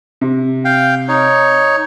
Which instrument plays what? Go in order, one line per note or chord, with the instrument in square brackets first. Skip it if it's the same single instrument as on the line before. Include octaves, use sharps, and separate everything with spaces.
[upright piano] C3
[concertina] F5 G5
D#4 C#5